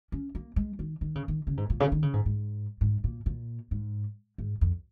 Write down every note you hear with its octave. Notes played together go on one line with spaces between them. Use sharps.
C#4
A#3
G#3
D#3
D#3
C#3
D#3
C#3
G#2
A#2
C#3
D#3
C#3
G#2
G#2
G#2
A#2
A#2
G#2
G#2
F2